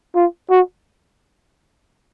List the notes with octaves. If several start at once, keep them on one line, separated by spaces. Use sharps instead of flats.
F4
F#4